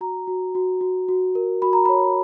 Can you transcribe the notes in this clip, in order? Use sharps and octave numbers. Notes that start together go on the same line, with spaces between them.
F#4 A#5
F#4
F#4
F#4
F#4
A#4
F#4 B5
A#5
C#5 B5